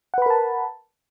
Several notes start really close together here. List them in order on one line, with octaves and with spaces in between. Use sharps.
F#5 B4 B5 A#4 A5